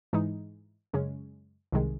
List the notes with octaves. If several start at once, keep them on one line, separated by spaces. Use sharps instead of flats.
G#2 E3 G#3 D#4
F#2 C#3 G#3 C#4
C2 C3 D#3 G#3